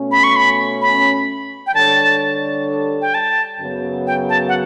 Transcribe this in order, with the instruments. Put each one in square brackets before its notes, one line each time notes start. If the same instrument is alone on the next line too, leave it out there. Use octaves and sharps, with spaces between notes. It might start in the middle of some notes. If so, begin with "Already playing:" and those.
Already playing: [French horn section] B2 A3 C#4
[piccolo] B5
C#6
B5
B5
G5
[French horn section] D3 G3 D4 A4 C#5 [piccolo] A5
[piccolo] G5
A5
[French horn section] F#2 C#3 F#3 B3 F#4
[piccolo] G5
A5
F#5